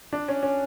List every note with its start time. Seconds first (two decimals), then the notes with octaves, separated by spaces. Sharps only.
0.13 D4
0.28 C#4
0.43 C#4